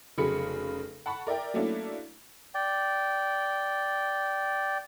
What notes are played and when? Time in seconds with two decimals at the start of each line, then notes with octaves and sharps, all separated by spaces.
0.18 F1 C#3 F#3 G#4 B5 C#7
1.06 F#5 A5 B5 C#6
1.27 A#4 D5 E5 G5
1.54 F#3 A3 A#3 C#4 D4 E4
2.55 D5 G5